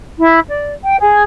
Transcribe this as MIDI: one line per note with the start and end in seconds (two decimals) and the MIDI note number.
0.19 0.39 64
0.48 0.72 74
0.83 0.99 79
0.99 1.22 68